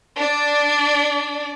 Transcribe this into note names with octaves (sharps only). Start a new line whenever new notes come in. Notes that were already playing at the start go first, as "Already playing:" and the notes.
D4 D5